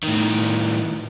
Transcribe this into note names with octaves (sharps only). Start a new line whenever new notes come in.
A2 D#3